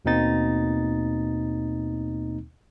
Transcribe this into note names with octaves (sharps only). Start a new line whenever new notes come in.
D#2 B2 A#3 C4 D#4 A6